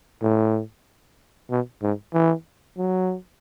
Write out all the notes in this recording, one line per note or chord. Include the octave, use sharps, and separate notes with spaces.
A2
B2
G#2
E3
F#3